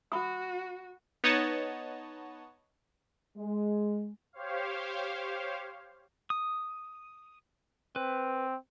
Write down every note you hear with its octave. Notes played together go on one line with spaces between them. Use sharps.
F#4 B5 D#6
B3 D#4 C#5 D#5 F#5 A5
G#3
G4 C5 C#5 F5
D#6
C4 B4